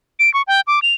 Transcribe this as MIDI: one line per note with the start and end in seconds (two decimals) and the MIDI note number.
0.19 0.32 98
0.34 0.42 85
0.48 0.61 79
0.67 0.80 86
0.82 0.94 101